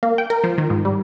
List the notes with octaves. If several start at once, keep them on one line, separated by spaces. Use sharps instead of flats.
A#3
G5
A#4
F3
D#3
G#2
G3